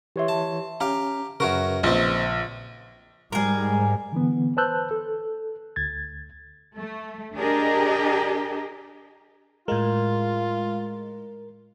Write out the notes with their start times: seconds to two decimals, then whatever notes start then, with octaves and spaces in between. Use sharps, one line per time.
0.16 E3 G4 C#5 E5 C6
0.28 A5
0.81 C#4 G4 F5 A#5
1.40 F#2 C#3 F#4 A#4 B4 C#6
1.83 A#1 C4 D#4 C6
3.32 G#2 G3 G#4 A#4
4.13 D3 E3 B3
4.57 B4 C5 A5 E6 F#6 G6
4.91 A4
5.76 D2 G#6 A6
6.77 A3
7.36 D4 G4 G#4 A#4 D#5
9.68 A2 G#3 F4 A#4